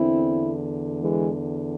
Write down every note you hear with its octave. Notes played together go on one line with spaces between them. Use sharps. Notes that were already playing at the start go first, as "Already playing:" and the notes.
Already playing: E2 D3 C4 E4
E3 G#3